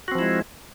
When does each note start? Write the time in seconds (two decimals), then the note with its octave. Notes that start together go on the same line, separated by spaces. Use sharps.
0.08 F#4
0.11 C4
0.15 F3
0.19 E4
0.22 G#3